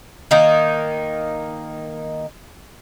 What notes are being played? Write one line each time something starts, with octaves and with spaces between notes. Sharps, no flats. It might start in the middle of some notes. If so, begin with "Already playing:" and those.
D#3 A#3 D#4